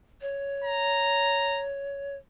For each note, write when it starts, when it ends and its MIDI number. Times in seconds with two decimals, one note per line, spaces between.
0.21 2.16 73
0.64 1.64 82